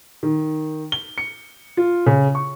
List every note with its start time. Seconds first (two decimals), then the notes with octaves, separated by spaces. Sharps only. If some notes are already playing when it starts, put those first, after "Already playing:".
0.23 D#3
0.92 G7
1.18 C#7
1.77 F4
2.06 C#3
2.35 C#6